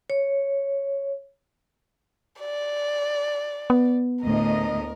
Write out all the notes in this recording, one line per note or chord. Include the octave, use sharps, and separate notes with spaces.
C#5
D5
B3
D2 A2 A#4 D#5